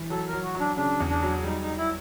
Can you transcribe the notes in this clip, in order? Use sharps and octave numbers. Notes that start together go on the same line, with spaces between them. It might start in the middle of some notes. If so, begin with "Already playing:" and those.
Already playing: E3
F#3 A4
A#4
F#3
F#4
F#3
D4
C#3 D4
E2
D4
F#3
G3 D#4
G3 D#4
E4